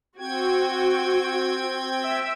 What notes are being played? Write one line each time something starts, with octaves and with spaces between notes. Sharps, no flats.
C4 F#4 G5 G#6
E5